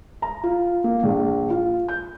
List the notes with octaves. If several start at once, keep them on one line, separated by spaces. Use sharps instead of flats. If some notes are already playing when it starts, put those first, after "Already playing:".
A#5
F4
A#3
A#1
F4
G6